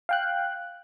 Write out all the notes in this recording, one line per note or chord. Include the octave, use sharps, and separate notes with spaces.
F5 G5 F#6